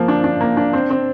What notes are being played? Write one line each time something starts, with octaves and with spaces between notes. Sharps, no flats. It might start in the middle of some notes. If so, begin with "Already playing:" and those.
Already playing: F3 A#3 C4
D4
D4
A#3
D4
C4
C4